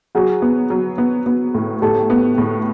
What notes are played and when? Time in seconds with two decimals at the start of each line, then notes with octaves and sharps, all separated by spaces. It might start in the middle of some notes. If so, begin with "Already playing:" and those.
0.15 F#3 F#4 G#4
0.42 B3
0.70 F#3
0.98 B3
1.26 B3
1.54 A2
1.82 A2 G4 A4
2.10 B3
2.38 A2